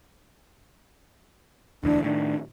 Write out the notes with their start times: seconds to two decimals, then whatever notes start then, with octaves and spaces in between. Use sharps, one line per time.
1.83 E1 D2 E3 D4
2.04 A2 D#3 D4